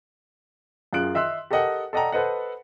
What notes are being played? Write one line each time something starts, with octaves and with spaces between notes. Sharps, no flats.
F#2 F4 G#4 F#6 D7
D#5 E5 C6 E6 F#6
G4 A4 A#4 D#5 F#5 G5
A4 D5 D#5 F#5 G5 A#5
A4 B4 C5 D#5 F#5